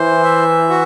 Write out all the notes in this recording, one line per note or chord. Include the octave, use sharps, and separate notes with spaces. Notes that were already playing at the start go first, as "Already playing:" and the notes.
Already playing: E3 C5
E5
F#4